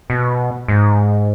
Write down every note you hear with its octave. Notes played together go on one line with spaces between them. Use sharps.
B2
G#2